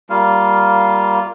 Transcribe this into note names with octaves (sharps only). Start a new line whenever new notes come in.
G3 A#3 F4 F5